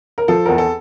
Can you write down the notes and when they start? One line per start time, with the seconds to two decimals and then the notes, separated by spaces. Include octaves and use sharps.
0.18 A#4
0.28 F3 A4
0.46 E2 A#4
0.58 A4